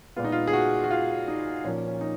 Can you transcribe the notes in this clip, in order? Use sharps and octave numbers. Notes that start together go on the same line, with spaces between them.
A#2 G#3 B3 F4
D#4
F4
G#4
F#4
F#4
F4
D#4
A#2 F3 A#3 C#4
C#4
D#4